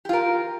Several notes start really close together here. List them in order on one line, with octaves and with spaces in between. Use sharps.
G4 F4 A#4